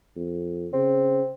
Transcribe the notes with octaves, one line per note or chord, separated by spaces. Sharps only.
F2
C#3 C4